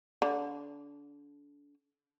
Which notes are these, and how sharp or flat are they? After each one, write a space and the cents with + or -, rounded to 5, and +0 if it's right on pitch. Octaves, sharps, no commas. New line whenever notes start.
D3 -30